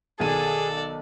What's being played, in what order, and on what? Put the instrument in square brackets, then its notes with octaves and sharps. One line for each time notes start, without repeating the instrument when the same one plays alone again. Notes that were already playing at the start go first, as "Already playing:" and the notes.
[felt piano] B1 D#3 D#7 [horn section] G#4 [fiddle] A4 D5